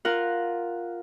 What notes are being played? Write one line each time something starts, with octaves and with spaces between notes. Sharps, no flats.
F4 A#4 F#5